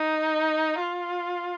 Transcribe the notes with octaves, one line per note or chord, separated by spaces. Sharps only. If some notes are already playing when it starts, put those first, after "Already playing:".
Already playing: D#4
F4